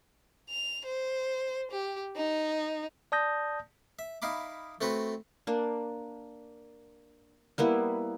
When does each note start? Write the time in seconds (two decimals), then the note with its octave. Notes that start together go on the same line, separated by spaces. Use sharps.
0.50 F7
0.85 C5
1.71 G4
2.16 D#4
3.12 D5 A5 D#6 G6 A#6
3.99 E5
4.22 D#4 E4 F5 B5 D6
4.81 A3 C4 F#4 B4
5.47 A#3 D4
7.58 G3 A#3 B3 E4